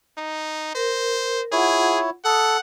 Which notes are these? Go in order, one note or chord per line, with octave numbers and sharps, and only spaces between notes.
D#4
A#4 C5
E4 F4 G#4 C#5 F#5
A4 F#5 D#6